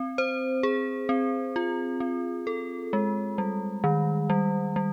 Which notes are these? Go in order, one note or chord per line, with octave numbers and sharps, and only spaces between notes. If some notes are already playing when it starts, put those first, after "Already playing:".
Already playing: C4
C5
G#4
C4
F4
C4
A4
G#3
G3
D#3
G3
G3